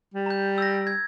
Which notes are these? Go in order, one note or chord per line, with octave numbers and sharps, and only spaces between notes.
G3
A#5 G6
E6 A#6
G#6